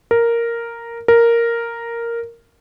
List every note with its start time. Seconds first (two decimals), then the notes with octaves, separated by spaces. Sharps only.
0.11 A#4
1.08 A#4